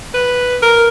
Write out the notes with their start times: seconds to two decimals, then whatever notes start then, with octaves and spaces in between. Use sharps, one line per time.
0.14 B4
0.62 A#4